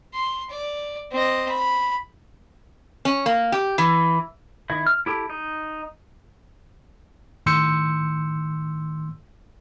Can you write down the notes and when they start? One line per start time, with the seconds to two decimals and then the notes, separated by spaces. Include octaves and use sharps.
0.14 C6
0.50 D5
1.12 C4 D#5
1.48 B5
3.05 C#4
3.26 A#3
3.52 G4
3.78 E3
4.70 D#3 E4
4.86 F6
5.06 E4 G4 A4
5.30 D#4
7.46 A2 D#3 C6 E6 G6 C#7